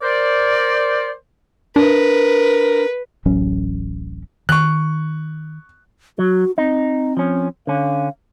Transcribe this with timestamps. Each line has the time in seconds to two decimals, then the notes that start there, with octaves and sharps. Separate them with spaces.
0.01 A#4 C5 D5
1.76 D4 A#4 B4
3.25 D1 A1 F#3 C#4
4.49 D#3 C#6 F#6
6.19 F#3 F#4
6.58 C4 D#4
7.17 F3 C#4
7.67 D3 C#4 F5